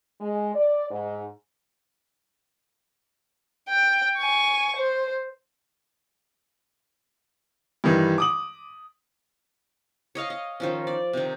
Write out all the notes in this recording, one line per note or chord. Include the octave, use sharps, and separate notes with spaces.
G#3
D5
G#2
G5
G#5 C#6
C5
G2 D#3 E3
D6 D#6 F#7
C#5 D#5 F5 C#6
D#5
D#3 F3 C#4
D5
C3 D#3